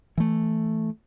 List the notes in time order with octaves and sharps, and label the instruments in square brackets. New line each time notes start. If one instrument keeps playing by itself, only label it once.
[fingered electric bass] E3 A3